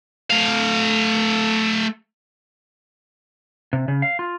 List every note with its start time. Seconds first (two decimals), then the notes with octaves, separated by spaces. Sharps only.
0.30 A3 F5
3.73 C3
3.88 C#3
4.02 F5
4.19 F4